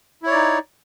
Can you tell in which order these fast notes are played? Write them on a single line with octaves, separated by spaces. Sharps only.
E4 C#5 D5 D#4